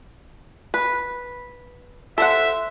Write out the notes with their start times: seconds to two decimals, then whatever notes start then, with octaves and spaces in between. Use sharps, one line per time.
0.74 B4
2.18 A4 C5 E5 F#5